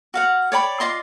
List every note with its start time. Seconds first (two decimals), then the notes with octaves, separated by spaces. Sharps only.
0.14 F#4 F5 F#5
0.52 C#5 D5 G5 B5
0.80 F4 D5 D#5 C6